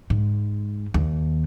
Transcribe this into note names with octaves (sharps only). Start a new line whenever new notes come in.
G#2
D#2